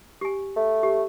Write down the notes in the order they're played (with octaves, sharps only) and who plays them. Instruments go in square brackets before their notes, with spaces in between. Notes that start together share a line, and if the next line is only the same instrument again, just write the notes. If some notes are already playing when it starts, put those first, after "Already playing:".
[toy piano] G4 G#5
[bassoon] A3
[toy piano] G4